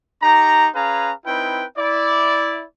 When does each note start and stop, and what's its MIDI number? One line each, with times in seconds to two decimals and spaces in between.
0.22 0.69 63
0.22 0.69 67
0.22 0.69 82
0.75 1.12 61
0.75 1.12 68
0.75 1.12 71
0.75 1.12 77
0.75 1.12 82
1.26 1.65 60
1.26 1.65 63
1.26 1.65 64
1.26 1.65 71
1.26 1.65 79
1.78 2.63 64
1.78 2.63 74